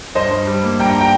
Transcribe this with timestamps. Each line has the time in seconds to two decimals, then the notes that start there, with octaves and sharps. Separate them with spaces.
0.15 G2 C5 D#5
0.31 G2
0.47 G3
0.64 A#3
0.79 G2 G5 A#5
0.90 G5 A#5
1.00 G5 A#5